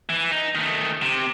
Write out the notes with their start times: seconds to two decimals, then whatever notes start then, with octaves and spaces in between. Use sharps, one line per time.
0.09 E3
0.31 D#4
0.55 D#3 A3
1.02 C3